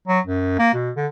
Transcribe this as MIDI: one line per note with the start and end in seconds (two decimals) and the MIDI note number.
0.08 0.20 54
0.26 0.57 42
0.59 0.72 58
0.74 0.91 47
0.96 1.07 50